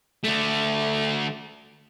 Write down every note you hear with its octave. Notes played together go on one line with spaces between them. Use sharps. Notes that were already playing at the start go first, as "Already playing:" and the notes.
D3 A3